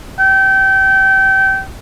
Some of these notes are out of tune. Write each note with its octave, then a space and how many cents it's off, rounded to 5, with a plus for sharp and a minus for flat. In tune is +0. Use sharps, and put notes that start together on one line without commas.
G5 -25